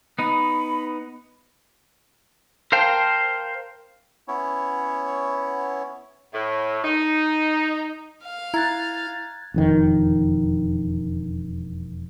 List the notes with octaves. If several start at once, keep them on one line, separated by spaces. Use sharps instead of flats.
B3 D#4 B5
A#4 C5 F5 G5 A5
B3 C#4 E4 C#5
A2
D#4
F5
E4 A#5 F#6 G#6 A6
E1 F2 D#3